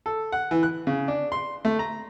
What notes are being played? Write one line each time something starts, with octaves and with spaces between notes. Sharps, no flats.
A4
F#5
E3
F#6
C#3
D4
C6
A3
A#5